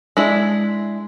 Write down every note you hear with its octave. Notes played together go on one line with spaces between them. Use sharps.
G#3 D4 E4